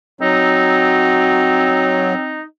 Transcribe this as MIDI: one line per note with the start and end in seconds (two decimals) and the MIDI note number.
0.21 2.14 54
0.21 2.39 60
0.21 2.43 63